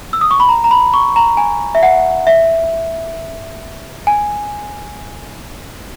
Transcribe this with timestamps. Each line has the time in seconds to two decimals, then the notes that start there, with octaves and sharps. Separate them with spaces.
0.13 E6
0.21 D#6
0.31 C#6
0.40 B5
0.49 A#5
0.64 A#5
0.71 B5
0.94 C#6
1.16 A#5
1.37 G#5
1.75 E5
1.83 F#5
2.27 E5
4.07 G#5